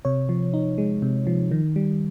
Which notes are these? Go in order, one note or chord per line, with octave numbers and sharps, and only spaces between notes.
C3 C#5
F3
D#4
G#3
C3
F3
D#3
G3